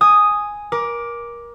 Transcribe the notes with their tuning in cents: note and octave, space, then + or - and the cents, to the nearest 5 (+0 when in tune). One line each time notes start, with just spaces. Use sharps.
G#5 +0 D#6 +0
A#4 +25 D6 +0